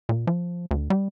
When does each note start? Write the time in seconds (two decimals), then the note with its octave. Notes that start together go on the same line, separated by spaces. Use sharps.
0.09 A#2
0.27 F3
0.71 D2
0.90 G3